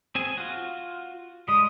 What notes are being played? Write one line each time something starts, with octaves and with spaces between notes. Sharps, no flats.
C4 G#4 G#5
F4 F#4
G3 G#3 D#6